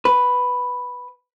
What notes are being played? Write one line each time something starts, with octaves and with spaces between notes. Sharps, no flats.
B4